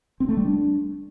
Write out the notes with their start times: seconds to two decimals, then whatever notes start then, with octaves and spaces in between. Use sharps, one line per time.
0.20 C4
0.29 A3
0.37 G3
0.45 D4